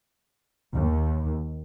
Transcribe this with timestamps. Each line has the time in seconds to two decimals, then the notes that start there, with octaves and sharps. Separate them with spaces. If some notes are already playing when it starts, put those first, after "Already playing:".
0.73 D#2